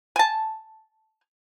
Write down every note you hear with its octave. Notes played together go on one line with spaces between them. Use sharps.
G#5 A5